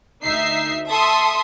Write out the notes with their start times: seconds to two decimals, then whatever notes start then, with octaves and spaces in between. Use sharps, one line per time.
0.25 D2 D#4 E5 C7
0.90 A4 E5 C6 D#6